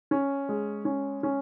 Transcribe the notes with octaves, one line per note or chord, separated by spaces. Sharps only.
C#4
G#3
C#4
C#4